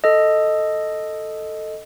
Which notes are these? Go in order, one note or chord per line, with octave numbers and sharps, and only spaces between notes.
A4 D#5